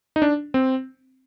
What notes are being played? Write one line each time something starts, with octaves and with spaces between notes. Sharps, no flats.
D#4
D4
C4